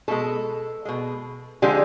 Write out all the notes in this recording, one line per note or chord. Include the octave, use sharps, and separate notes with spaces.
B2 G#3 A4
B2 G#3
D3 F3 G#3 G4